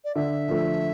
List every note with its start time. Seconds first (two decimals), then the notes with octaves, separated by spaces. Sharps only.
0.05 D5
0.15 D3 E5
0.48 F3 A3